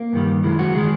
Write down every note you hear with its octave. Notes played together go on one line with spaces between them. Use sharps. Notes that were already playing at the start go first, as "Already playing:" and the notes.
Already playing: A#3
G2 D#3 G3
F#2 D#3 G#3 E4
F#4
D#3 G#3 G#4